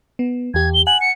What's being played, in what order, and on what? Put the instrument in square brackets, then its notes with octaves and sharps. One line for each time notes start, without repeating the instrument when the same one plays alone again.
[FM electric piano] B3
[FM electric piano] E2 G4 [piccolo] G#6
[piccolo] G7
[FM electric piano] F#5 G#5 [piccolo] F#7
[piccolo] C#7